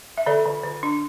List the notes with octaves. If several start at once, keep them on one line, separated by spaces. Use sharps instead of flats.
E5
D3 A4 D5
D3
D3
D4